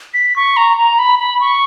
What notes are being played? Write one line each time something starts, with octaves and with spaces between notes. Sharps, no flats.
B6
C#6
A#5
A#5
B5
B5
C#6